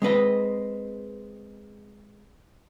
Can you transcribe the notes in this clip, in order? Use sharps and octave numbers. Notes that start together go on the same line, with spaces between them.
G#3 C4 B4 D#5